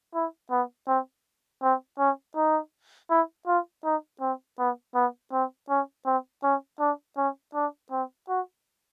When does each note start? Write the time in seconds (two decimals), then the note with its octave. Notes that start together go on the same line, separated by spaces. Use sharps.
0.15 E4
0.51 B3
0.88 C4
1.63 C4
1.99 C#4
2.36 D#4
3.10 E4
3.47 F4
3.85 D#4
4.21 C4
4.59 B3
4.95 B3
5.33 C4
5.69 C#4
6.06 C4
6.43 C#4
6.80 D4
7.17 C#4
7.55 D4
7.91 C4
8.29 F#4